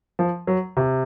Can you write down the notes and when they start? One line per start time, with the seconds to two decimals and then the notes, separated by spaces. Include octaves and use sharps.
0.19 F3
0.47 F#3
0.77 C3